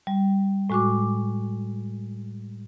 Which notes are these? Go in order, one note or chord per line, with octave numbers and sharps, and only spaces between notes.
G3
A2 G#3 F#4 C#6 D6